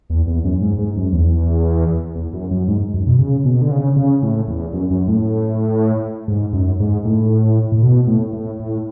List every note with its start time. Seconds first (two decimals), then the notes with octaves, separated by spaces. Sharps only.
0.10 E2
0.27 E2
0.45 F#2
0.62 G#2
0.78 G#2
0.96 F#2
1.13 E2
2.16 E2
2.33 F#2
2.51 F#2
2.68 G#2
2.94 F#2
3.07 B2
3.18 C#3
3.45 B2
3.62 D3
3.71 C#3
3.96 C#3
4.23 A2
4.48 E2
4.73 F#2
4.91 F#2
5.08 A2
6.28 G#2
6.53 F#2
6.80 G#2
7.05 A2
7.72 A2
7.83 B2
8.07 A2
8.33 A2
8.60 A2